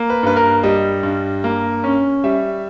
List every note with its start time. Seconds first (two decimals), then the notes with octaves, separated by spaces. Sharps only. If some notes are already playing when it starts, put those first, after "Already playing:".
Already playing: A#3
0.10 B4
0.23 G2 B4
0.36 A#4
0.63 G3 D#5
1.03 G2
1.44 A#3
1.84 C#4
2.24 G3 E5